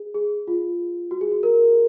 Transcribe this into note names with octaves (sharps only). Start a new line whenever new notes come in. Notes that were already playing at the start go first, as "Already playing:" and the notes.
Already playing: G#4
G#4
F4
F#4
G#4
F#4
A#4